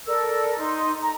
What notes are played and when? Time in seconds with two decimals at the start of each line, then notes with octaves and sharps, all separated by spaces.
0.06 A4 A#4 D5 E6
0.58 D#4 C6
1.02 A#5